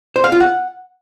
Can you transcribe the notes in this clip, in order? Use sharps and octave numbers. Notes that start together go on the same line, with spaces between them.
C5
F5
F4
F#5